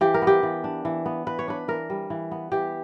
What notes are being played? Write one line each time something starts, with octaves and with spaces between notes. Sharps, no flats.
E3 G4
A#4
B3
G4
E3
D4
E3
B3
E3 B4
C#5
D4 B4
E3 A#4
G3
E3
B3
E3 G4